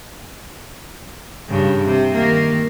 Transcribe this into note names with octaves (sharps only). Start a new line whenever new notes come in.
G2 C#3
C3
D#3 A#3